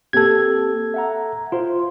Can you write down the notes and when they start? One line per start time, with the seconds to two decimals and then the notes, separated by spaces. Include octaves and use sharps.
0.13 A#3 C4 G4 A4 G#6
0.94 E5 F#5 A#5
1.52 F4 C5 C6